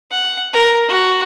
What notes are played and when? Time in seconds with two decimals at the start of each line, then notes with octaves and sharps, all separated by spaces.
0.11 F#5
0.53 A#4
0.88 F#4